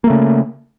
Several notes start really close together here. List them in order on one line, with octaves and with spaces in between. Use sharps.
A#3 A3 C#3